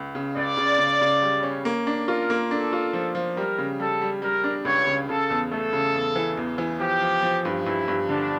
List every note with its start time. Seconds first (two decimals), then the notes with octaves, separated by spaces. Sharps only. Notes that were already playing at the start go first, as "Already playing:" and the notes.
Already playing: C#2
0.15 C#3
0.36 C#2 D5
0.57 C#3
0.79 C#3
1.01 C#3
1.22 G3
1.43 C#4
1.65 A#3
1.87 D4
2.07 F4 A#4
2.30 A#3
2.51 D4 A4
2.73 F4
2.93 F3
3.15 F3
3.36 G3 A#4
3.58 C#3
3.80 G3 A4
4.02 G3
4.22 G3 A#4
4.44 D4
4.65 C#2 C#5
4.87 C#3
5.09 C#3 A4
5.30 E2
5.51 A3 A4
5.73 C#3
5.95 E2
6.16 E3
6.37 E2
6.58 E3
6.80 F3 G4
7.01 F3
7.22 F3
7.45 G2
7.66 G2 E4
7.88 G2
8.09 D3 D4